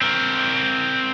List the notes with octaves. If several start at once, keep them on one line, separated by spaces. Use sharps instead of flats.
C4 A#4